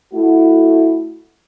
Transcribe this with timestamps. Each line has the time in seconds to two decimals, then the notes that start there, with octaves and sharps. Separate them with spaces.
0.13 A3 E4 F#4